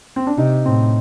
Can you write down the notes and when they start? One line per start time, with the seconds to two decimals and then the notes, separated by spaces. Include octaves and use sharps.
0.16 C4
0.27 D4
0.37 C3 D#4
0.65 A2 C4